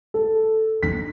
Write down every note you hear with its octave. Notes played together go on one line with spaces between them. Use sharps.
A4
D4 D#4 B6